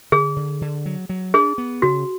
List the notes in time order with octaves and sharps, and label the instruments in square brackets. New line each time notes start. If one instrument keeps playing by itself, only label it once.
[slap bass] D3 [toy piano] G#4
[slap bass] D3
D3
F#3
F#3
[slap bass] D4 [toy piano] G#4
[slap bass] B3
[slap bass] C#3 [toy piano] F#4